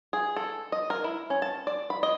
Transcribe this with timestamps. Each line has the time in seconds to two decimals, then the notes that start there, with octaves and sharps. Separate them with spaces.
0.13 G#4
0.36 A4
0.72 D#5
0.90 A#4
1.04 E4
1.30 C#4
1.42 A5
1.67 D5
1.90 B5
2.03 D#5